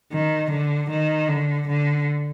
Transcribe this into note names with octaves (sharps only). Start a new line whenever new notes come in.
D#3
D3
D#3
D3
D3